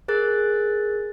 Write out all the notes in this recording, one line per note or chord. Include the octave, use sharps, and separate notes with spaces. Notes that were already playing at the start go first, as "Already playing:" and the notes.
G#4 A#4 F#6 A6